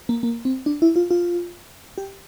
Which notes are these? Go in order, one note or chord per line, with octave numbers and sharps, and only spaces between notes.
A#3
A#3
C4
D4
E4
F4
F4
G4